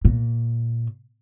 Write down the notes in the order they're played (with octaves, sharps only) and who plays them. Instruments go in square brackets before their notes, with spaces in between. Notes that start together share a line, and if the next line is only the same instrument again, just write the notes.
[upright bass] A#2